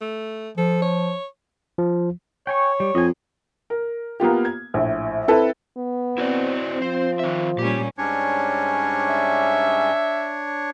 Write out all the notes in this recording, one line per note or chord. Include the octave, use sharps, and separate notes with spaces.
A3
F3 A4
C#5
F3
C#5 G5 G#5 C#6
G3
F2 D#5 G#5
A#4
A#3 B3 F4 G4
G#6
A#1 A2
C4 E4 A4 B4 A5
B3
C4 E4 F#4 D5
F3 C5
D#3 E5
A#2 G3 C#4 G4
G#2 G3 C#4 D4 C#5
E5